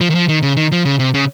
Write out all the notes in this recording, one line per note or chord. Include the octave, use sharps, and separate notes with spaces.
F3
D#3
F3
D#3
C#3
D#3
F3
C#3
C3
C#3